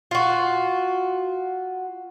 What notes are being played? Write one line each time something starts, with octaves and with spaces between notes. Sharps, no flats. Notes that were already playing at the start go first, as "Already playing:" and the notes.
F4 F#4